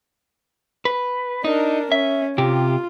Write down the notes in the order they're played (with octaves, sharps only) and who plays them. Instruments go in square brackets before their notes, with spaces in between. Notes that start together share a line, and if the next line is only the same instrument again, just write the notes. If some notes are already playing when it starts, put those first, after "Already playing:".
[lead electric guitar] B4
[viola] D4 A#4 [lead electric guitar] D#4
[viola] C#4 [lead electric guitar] E5
[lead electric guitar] C3 G4 [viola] F4